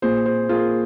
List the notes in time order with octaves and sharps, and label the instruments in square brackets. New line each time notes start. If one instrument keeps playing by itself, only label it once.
[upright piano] A#2 [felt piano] G#4 C5
[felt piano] G#4 C5
[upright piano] A#3 [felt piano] F4 G#4